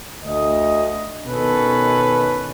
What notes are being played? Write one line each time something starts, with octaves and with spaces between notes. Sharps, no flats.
D2 D#5
B2 D#3 C#4 A4 B4